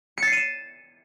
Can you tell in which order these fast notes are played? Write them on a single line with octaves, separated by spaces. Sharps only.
C#7 A6 C7 D#7 E7